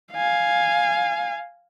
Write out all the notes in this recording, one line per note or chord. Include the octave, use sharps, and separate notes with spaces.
F5 G#5